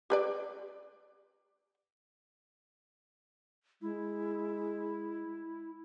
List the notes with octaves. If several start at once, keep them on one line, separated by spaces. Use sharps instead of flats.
G4 B4 D5
G#3 E4